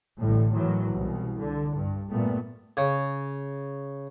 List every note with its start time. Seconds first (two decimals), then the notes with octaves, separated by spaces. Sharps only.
0.20 A1 A2 D3 G3
0.53 A2 D#3 E3 F#3
0.92 C2 B2
1.39 D3
1.77 G2
2.10 A#2 G3 A3 B3
2.77 C#3